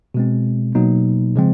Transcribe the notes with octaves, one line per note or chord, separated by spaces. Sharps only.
B2 G#3 C4
B2 F#3 A#3 D#4
C#3 F3 G#3 C4